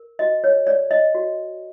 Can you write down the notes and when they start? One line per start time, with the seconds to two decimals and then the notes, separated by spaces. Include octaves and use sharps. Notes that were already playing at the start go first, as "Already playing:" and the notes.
Already playing: A#4
0.19 F#4 D#5
0.44 C#5
0.67 C#5 D5
0.91 D#5
1.15 F#4